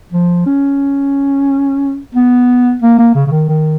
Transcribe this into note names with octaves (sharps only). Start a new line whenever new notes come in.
F3
C#4
B3
A#3
A#3
C#3
C#3
D#3
D#3